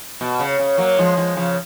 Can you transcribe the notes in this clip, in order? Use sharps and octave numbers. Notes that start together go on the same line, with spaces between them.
B2
C#3
C#3
F#3 A#3
F3 G#3
F3 G#3
C#3 F3